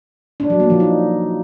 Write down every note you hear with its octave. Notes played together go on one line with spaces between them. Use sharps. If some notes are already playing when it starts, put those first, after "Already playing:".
D4
F#3
A#3
F3
D#4